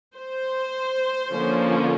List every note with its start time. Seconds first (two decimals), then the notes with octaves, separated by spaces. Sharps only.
0.15 C5
1.31 D3 F3 A#3 C#4